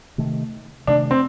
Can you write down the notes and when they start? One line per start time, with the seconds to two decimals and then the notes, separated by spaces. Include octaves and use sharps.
0.18 C3 D#3 A3
0.87 C3 D#3 A3 D4
1.11 C4